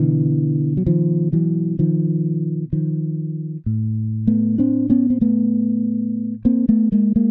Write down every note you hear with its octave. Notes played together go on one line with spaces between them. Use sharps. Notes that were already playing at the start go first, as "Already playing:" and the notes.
Already playing: B2 D3 E3
F#3
D#3 F3
E3 F#3
D#3 F3
D#3 F3
A2
A3 B3
C4 D4
B3 C#4
C4
A3 B3
A#3 C4
A3 B3
G#3 A#3
G#3 A#3